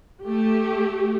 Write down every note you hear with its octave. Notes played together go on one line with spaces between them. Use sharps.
A3 G4